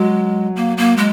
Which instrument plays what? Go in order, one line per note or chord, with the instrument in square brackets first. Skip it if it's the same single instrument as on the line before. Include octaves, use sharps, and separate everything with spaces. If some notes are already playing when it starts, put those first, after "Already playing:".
Already playing: [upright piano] F#3 [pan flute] G#3
[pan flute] A#3
A#3
G#3